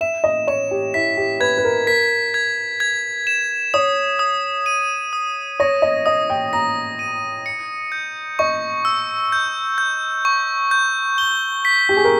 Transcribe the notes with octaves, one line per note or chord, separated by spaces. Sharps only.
E5 E7
D#5
C#5 E7
G4
E4 B6
G4
B4 G#6
B4
A#4
A#4 B6
G#6
G#6
E7
C#5 D#6
D#6
D#7
D#6
C#5 A#6
D#5
D#5 D#6
G5
A#5 A#6
D#7
C#7
G6
D#5 C#6
E6
G6
G6
C#6
G6
G7
B6
G4
G#4
A#4